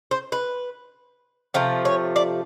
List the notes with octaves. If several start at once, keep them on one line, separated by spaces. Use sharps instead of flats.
C5
B4
C3 F3 A3
C#5
D5